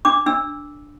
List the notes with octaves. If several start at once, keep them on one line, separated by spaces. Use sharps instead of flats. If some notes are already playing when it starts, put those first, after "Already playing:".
D4 D6
D4 E6